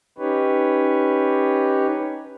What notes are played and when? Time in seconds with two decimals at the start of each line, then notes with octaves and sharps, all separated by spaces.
0.18 C#4 D#4 G4 B4 C#5